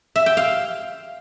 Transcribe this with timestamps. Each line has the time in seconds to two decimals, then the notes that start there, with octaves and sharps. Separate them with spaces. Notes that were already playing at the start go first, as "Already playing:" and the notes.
0.16 E5
0.26 G5
0.37 F5